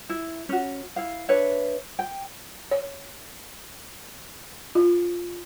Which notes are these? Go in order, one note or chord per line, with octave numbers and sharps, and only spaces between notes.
E4
C#4 F#4
E4 F5
D4 B4 C#5 E5
G5
C#5
F4